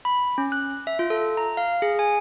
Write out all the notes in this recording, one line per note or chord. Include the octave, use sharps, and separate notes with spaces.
B5
C#4
F#6
E5
F4
A4
A#5
F5
G#4
G#5